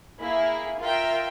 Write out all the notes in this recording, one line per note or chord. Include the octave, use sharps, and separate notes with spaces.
A#3 E4 G#4
F4 A#4 E5 G5